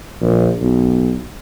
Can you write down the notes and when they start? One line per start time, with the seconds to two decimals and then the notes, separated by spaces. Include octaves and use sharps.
0.21 A#1
0.61 B1